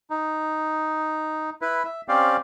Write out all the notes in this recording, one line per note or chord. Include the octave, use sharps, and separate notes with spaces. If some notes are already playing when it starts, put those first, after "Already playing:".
D#4
E4 B4
E5
C4 C#4 G4 C5 D5 F5